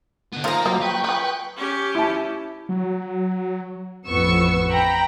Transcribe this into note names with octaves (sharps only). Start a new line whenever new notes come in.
D3 B3
F3 A#3 D#4 G#4 A#4 F5 A#5
F#3 G3 F4 D#5
B4 G5 C#6
G4 G#4 B4
C#4 G4
E4 A5
F#3
A1 F2 B3 C#6 E6
G5 A#5 B5